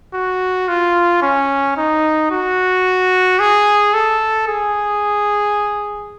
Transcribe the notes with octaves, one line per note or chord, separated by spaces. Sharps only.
F#4
F4
C#4
D#4
F#4
G#4
A4
G#4